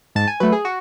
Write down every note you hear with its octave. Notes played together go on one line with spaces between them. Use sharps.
G#2 A5
G#5
F#3 A3 B4
G#4
F#4